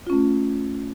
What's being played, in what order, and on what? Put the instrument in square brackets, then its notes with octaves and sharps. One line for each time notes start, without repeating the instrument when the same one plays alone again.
[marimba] F4
C#4
A3